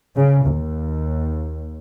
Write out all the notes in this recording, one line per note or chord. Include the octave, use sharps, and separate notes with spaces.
C#3
D#2